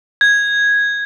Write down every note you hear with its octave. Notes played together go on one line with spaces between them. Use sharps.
G#6